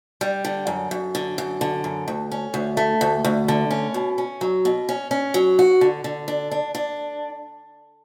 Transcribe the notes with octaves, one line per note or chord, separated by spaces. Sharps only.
G3
D3
F#2
F#2
D3
F#2
D3
F#2
D2
C#4
D2
A3
D2
D2
D3
C#4
B2
C#4
F#3
B2
C#4
C#4
F#3
F#4
D3
D3
D4
D4
D4